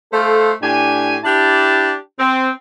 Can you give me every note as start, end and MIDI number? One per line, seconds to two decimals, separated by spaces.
0.13 0.53 57
0.13 0.53 69
0.13 0.53 72
0.13 0.53 77
0.63 1.18 45
0.63 1.18 62
0.63 1.18 67
0.63 1.18 80
1.24 1.96 62
1.24 1.96 64
1.24 1.96 67
1.24 1.96 81
2.19 2.50 60